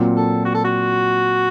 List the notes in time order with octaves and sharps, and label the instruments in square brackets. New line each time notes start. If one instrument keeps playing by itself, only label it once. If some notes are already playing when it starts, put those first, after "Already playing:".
Already playing: [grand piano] A#2 F#3 C4 F4
[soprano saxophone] A4
F#4
A4
F#4